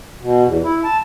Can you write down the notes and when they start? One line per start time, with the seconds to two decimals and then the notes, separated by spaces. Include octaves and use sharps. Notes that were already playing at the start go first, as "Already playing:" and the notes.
0.21 B2
0.44 E2
0.64 E4
0.84 A5